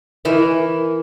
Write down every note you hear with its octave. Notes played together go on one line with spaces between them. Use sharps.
E3 E4 A#4 E5